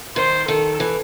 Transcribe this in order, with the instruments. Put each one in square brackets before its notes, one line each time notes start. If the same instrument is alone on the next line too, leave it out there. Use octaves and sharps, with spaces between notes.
[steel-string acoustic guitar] D#3 [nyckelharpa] C5
[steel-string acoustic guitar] D#3 [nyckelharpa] A4
[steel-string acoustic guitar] E3